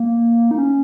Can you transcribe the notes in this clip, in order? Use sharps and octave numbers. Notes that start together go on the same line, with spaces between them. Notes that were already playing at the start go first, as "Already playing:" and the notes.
Already playing: A#3
D#4
C#4